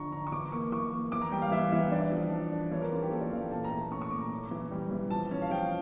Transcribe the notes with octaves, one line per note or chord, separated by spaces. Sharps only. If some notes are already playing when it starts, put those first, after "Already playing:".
Already playing: D3 F3 D4 A#5 C#6
D4 A#5
C#6
E3 D6
A#3 C#6
E3 C#6
A#3
E3 D6
A#5
G3 G5
F5
E3 E5
E3 E5
D4 D5
F3
D4
D4
E3 C#5
A#4
C#4 F4
G4
A#3 A4
D5
E3 F5
G5
A#2 A5
A#5
A3
C#4 C#6
C#6
A#2 D6
A#5
C#4
E3
G3
E3
F3 A5
C#4
F5
F3 G5